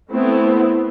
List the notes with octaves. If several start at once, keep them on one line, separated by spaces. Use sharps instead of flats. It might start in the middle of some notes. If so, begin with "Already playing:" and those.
A3 B3 C4 E4